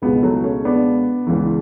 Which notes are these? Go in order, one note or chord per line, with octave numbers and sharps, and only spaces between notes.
C#2 B2 G#3 B3
F#3 A3
A3 C#4
B3 D4
C#2 C#3 E3